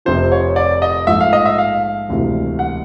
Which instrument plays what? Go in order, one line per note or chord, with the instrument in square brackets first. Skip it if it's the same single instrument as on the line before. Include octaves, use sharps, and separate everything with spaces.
[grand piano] F1 F2 C3 F3 [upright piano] C5
[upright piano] C#5
D5
D#5
[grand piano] A#1 G#2 F3 A3 [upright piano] E5
[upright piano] F5
D#5
E5
F5
[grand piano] E1 D2 C3 E3
[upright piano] F#5